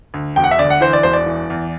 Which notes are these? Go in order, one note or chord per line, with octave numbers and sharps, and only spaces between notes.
D2
E1 G5
F#5
E5
D2 D5
F#5
E3 C5
D5
E1 C5
D5
E3
E2